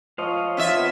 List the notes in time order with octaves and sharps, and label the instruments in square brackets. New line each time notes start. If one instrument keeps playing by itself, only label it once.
[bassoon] F3 [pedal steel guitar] C#5 D#5 F5
[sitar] C4 F4 E5
[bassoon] B3